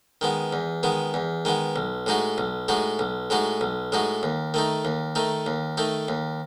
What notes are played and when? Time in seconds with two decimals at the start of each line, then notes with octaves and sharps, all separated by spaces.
0.21 D#3 G#3 B3
0.53 E2
0.83 D#3 G#3 B3
1.14 E2
1.45 D#3 G#3 B3
1.76 B1
2.06 A2 G#3 D#4 F#4
2.38 B1
2.68 A2 G#3 D#4 F#4
2.99 B1
3.30 A2 G#3 D#4 F#4
3.61 B1
3.92 A2 G#3 D#4 F#4
4.23 D#2
4.54 D#3 A3 D#4
4.85 D#2
5.15 D#3 A3 D#4
5.46 D#2
5.77 D#3 A3 D#4
6.08 D#2